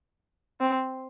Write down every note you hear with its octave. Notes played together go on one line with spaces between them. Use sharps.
C4